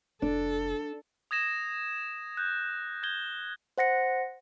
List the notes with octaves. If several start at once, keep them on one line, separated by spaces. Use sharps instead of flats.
F1 D4 A4
D#6 G#6 A#6 E7
F#6 G6
G6 G#6 G7
C5 F#5 A#6 C#7